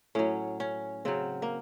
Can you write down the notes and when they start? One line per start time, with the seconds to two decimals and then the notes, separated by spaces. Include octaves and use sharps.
0.15 A2 F#3 C#4
0.60 C#4
1.05 C#3 F#3 C4
1.42 A#3